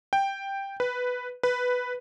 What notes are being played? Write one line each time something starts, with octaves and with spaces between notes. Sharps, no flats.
G5
B4
B4